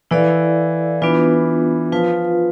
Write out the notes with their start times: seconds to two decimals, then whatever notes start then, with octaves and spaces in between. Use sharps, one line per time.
0.11 E3 E4 A4 D5 F5
1.02 E3 B3 D4 F4 B4
1.92 F3 F4 B4 F5